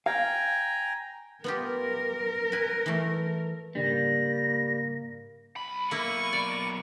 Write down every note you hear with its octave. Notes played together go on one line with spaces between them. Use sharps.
F5 G5 G#5 A#5
B3 F4 G4 A#4
B4 G#5
E3 A3
G#2 C#3 G3 A#3 D4 A#6
B1 B5
A#3 E4 C#6
D5